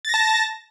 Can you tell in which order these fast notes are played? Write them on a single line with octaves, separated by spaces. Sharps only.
A6 A#6 A5